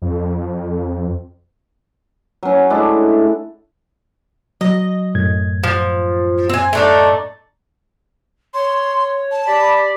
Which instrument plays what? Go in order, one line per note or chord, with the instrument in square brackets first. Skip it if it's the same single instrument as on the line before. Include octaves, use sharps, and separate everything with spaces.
[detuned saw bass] F2
[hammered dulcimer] F#3 C#4
G#3 A3 D4 E4
[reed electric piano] F#3 [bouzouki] D#5
[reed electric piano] F#2 A2 G#6
[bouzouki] F3
C4 G#5
A3 D4 D#4
[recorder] C#5 [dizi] C6
[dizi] A5
[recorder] G4 [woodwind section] D5 B5